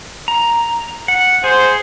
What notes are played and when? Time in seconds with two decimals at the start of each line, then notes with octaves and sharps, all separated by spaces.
0.28 A#5
1.08 F#5
1.44 G#4 C5